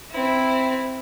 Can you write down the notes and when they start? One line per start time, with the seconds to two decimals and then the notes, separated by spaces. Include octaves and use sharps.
0.11 C4 E4